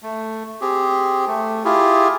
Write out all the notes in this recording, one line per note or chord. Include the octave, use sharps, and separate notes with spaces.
A3
C4 G4 G#4
A3
E4 F4 G4 G#4